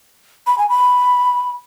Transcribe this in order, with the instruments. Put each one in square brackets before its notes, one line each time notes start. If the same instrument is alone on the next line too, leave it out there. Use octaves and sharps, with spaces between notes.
[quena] B5
G#5
B5